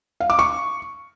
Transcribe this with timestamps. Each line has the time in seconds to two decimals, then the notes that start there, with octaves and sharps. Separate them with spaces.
0.20 F5
0.30 D6
0.39 C#6